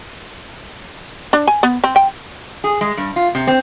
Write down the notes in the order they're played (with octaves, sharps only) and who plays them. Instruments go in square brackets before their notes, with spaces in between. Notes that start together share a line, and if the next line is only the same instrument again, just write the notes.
[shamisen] D4
G#5
B3
C4
G5
[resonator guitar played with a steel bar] G#4
G#3
G2
F4
C3
C4